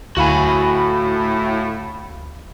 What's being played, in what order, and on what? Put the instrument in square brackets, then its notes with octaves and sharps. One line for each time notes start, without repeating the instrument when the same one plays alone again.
[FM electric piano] D2 F5 B5 [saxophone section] A2 [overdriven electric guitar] F#4 G#5